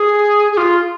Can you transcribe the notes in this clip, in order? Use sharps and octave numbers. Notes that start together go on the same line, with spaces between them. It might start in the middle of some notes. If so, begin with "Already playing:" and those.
Already playing: G#4
G#4
F4